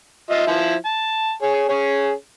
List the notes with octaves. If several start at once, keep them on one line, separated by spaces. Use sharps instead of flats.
F4 D#5 E5
F3 E4
A5
G#4 C#5
C#4 G#4 C#5